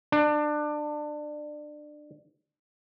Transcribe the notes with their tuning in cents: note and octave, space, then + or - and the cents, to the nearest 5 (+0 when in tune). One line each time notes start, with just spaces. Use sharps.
D4 +25